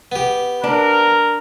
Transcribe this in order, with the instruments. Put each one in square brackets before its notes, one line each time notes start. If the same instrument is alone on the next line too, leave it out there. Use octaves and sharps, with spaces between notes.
[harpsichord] B3 G4
[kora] D4 [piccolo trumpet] A#4